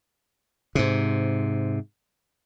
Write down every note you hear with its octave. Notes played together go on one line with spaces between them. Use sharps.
G#2 C3